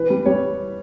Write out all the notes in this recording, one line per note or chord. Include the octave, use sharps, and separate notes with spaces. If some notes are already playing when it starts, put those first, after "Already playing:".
Already playing: E3 B4
G3
G3 C#5